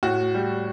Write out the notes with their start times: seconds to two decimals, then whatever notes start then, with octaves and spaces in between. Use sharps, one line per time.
0.03 A2 F#4
0.34 G3